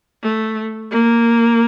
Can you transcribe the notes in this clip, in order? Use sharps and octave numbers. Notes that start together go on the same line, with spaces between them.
A3
A#3